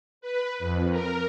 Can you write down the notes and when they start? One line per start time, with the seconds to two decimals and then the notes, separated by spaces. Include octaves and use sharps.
0.21 B4
0.59 F2
0.91 A#4